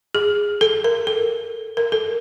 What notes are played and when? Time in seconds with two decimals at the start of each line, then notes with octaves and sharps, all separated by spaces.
0.15 G#4
0.61 A4
0.84 A#4
1.07 A4
1.77 A#4
1.92 A4